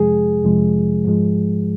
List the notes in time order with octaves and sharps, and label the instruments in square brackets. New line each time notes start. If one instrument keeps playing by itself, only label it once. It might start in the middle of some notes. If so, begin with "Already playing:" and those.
Already playing: [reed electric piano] F2 C3 F3 G#3 G#4
F2 C3 F3 G#3
G#2 F3 G#3